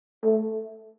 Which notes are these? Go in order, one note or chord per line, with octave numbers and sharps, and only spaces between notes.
A3